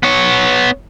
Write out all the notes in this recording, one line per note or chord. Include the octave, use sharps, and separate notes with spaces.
B3 C#5